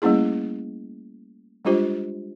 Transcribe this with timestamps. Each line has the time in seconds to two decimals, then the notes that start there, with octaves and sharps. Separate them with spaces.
0.02 G3 A3 A#3 C#4 E4 G#4
1.65 G3 G#3 D4 F4 G4 C5